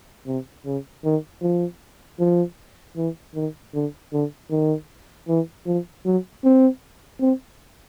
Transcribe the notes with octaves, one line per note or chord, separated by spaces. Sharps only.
C3
C#3
D#3
F3
F3
E3
D#3
D3
D3
D#3
E3
F3
F#3
C4
C4